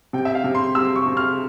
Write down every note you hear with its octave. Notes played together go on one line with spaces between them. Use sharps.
C3 G5
E5
F5
C3
C6
C3 E6
C#6
C3
F6